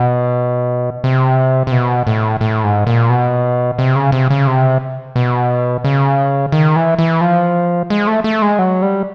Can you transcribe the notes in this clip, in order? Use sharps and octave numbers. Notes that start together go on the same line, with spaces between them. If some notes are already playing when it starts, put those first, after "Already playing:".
Already playing: B2
C3
C3
B2
A2
A2
G#2
A#2
B2
C3
C#3
C3
C#3
C3
B2
C#3
D#3
E3
E3
F3
G#3
A3
A3
G#3
F#3
G3